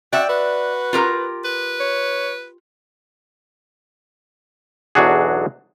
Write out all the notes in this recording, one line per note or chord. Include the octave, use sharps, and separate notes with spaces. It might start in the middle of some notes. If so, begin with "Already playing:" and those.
F#4 D5 E5 G5
F#4 B4
F4 G4 A#4
B4
C#5
B1 E2 F#3 D4 F#4 G#4